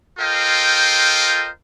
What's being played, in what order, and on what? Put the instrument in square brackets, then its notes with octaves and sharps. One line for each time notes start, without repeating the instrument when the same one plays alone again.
[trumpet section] F4 A4 A#4 C5 D#5 G5